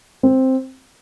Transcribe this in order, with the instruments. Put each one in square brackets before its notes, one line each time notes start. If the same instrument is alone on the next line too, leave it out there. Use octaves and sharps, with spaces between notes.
[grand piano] C4